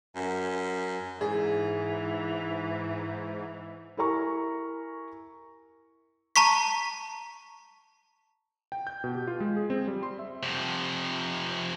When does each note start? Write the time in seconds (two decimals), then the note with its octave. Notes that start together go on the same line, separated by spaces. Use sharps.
0.16 F#2
1.21 G#2 E3 G#4
3.97 E4 G4 A#4 G#5 A#5 C#6
6.36 A5 A#5 C#6 B6
8.72 G5
8.87 G6
9.04 B2
9.15 G4
9.28 F4
9.40 G#3
9.56 G#4
9.70 C4
9.87 G3
10.03 C6
10.19 E5
10.43 F2 C3